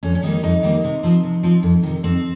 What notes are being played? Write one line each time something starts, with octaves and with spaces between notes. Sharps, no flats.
F2 C#4
C#4
D#3 G3 A#3 D#4
F2 D#4
D#3 G3 A#3
C3
F3 C4
C3
F3 C4
F2
C3 D#3
F2 C4